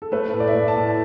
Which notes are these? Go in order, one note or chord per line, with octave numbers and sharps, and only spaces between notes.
A4
A3 B4
A2
D5
E5
A2 D5
A5
A2